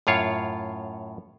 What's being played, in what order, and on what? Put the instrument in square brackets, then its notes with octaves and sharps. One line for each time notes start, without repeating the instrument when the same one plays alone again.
[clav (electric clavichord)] F#2 A2 F4 C#5 F5